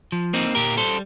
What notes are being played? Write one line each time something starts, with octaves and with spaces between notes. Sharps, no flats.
F3
A#3 C4 D#4
A#2 G4 A#4
G3 A4 C5